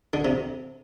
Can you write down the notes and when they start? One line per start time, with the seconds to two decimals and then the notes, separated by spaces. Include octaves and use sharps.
0.13 D3
0.25 C3